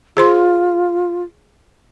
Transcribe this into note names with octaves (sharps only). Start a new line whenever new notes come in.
F4 G#4 C5 C6